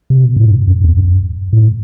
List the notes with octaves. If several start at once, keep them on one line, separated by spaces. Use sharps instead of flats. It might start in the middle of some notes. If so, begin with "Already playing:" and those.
C3
B2
A2
G2
F#2
E2
G2
F#2
A2